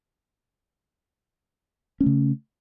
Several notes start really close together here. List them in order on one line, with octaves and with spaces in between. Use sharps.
C#4 A3 C#3